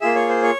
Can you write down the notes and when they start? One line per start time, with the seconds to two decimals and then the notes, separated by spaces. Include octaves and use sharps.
0.01 A#3 F4 G#4 E5
0.15 C#5
0.29 C5
0.43 C#5